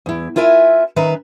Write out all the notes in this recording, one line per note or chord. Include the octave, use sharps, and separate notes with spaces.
E2 E4
E4 F4 A#4 E5 G#5
D#3 C#4 B4 E5 A#5